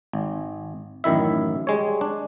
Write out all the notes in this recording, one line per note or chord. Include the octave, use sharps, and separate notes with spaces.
G#1
A1 F#2 D#3 E4 E5
G3 G#3 C#5
D4